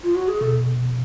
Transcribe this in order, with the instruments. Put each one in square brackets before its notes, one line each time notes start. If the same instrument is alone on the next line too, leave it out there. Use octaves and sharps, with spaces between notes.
[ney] F4
F#4
G#4
[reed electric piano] B2 [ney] A4